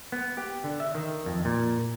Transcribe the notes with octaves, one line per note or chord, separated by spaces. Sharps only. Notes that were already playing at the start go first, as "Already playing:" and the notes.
B3
G4
D3
E5
D#3
F2
A#2